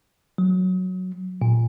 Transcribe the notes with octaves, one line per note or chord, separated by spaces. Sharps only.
F#3
A#2